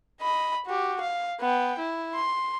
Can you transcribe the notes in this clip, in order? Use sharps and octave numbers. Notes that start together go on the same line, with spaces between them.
D#5 B5
F#4 G4
F5
B3 G5
E4
C6